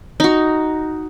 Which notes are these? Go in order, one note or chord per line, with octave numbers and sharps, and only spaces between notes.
D#4 F#4